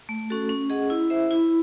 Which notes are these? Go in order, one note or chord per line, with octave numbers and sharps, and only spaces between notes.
A3
C#4 F#4 A4
C#4
G#4 D#5 F#5
E4
C5 E5
E4